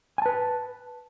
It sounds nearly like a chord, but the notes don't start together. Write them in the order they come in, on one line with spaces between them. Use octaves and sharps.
G#5 A5 B4